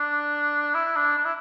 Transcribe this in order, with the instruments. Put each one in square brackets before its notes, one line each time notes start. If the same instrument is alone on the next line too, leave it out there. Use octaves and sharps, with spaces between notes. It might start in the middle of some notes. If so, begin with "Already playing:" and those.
Already playing: [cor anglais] D4
E4
D4
D4
E4